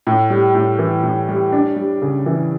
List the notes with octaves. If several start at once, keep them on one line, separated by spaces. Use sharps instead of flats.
A2
G3
A2
E3
A2
G3
D4
G3
C#3
E3